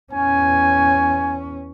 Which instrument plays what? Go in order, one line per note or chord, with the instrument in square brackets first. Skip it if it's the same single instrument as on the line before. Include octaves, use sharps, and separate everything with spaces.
[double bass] E2 C#4 [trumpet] G#5